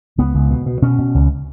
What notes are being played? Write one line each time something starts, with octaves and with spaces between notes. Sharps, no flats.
C#2 B3
C#2
B2
B2
B2 C#4
B2
C#2